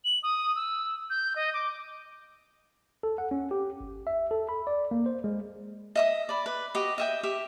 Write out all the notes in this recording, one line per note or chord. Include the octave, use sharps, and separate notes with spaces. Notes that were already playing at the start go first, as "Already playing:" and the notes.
F#7
D#6
E6
G6
D#5
D6
A4
F#5
C#4
G4
G1
E5
A4
B5
D5
A#3
C5
G#3
D#5 E5 D#6
D5 B5
B4
F#4 G4 D#5
D#5 E5 G5
G4 E5